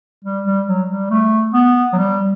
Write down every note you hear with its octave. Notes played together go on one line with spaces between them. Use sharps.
G3
G3
F#3
G3
A3
B3
F#3
G3